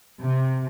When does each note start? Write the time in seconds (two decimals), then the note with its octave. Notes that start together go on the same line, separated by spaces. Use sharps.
0.22 C3